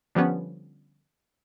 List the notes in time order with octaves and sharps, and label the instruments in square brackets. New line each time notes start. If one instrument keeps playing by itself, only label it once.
[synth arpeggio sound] D3 F3 G3 B3 C#4